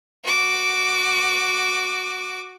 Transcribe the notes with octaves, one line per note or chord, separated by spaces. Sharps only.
F#4 D6